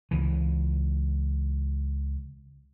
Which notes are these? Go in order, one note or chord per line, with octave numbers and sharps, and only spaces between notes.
C#2 E3